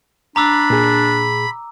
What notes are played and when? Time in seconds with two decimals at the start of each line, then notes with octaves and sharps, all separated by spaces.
0.36 D4 A#5 B5 D6 E6
0.70 A#2 G#4